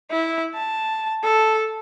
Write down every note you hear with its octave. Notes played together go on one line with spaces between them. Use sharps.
E4
A5
A4